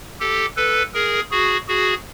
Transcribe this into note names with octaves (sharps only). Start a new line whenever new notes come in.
G4 A4
A4 B4
G#4 A#4
F#4 G#4
F#4 G#4